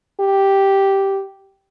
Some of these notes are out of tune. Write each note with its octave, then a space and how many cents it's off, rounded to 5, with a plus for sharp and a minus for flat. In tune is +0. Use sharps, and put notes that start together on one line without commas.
G4 -5